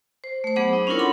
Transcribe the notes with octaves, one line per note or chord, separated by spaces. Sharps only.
C5
A3 C5
F#3 B3 G#4 C5 F#5 D6
D#4
C#4 D4 E4 F4 A#4 C#5
A4 F#5 B5 C6